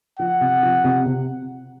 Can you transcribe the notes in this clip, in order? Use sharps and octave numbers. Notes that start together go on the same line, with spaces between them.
F3 F#5
C3
F3
C3
C3